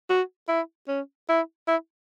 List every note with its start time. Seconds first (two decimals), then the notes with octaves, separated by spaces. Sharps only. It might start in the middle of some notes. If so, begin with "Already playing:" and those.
0.09 F#4
0.48 E4
0.88 C#4
1.29 E4
1.68 E4